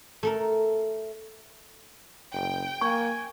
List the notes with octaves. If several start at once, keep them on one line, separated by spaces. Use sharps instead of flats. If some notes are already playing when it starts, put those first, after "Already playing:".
A3 A4 A#4
F#1 G5
A#3 G#5 C#6